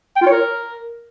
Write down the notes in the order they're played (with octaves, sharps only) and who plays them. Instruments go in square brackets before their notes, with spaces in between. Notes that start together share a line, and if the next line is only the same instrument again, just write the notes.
[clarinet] G5
F4
C#5
A#4